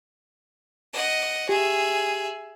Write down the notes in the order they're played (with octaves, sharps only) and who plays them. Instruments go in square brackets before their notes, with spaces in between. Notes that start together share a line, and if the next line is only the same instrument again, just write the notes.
[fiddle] D#5 F#5
[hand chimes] G4 [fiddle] G#4 E5